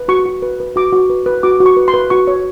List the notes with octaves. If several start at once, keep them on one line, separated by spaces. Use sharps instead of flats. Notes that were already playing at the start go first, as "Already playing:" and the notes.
Already playing: B4
F#4 C#6
F#4
B4
B4
F#4 D6
F#4
B4
B4
F#4 D6
F#4
C#6
B4
C6
B4
F#4 C#6
C#5